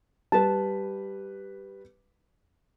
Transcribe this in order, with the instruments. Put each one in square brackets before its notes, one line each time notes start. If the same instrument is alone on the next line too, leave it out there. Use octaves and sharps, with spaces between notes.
[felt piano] G3 B4 [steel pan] A5